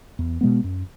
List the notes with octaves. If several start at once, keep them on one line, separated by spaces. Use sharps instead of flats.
E2
B2 G#3 B3
F#2